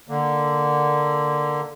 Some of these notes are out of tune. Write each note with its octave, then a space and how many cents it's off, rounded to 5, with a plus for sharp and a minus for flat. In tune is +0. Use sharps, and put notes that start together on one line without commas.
D3 +10 A#3 +0